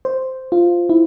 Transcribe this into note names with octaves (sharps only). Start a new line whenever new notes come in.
C5
F4
E4